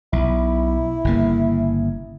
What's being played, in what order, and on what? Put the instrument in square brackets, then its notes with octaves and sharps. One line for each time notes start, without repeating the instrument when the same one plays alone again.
[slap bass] B1 [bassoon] E4
[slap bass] G1 C#3 A#3